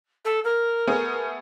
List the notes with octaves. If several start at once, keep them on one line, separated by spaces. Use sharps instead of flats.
A4
A#4
A3 B3 G#4